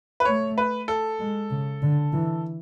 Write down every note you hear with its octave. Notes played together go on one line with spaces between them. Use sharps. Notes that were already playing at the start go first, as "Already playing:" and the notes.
B4
A3 C#5
B4
A4
G#3
C#3
D3
E3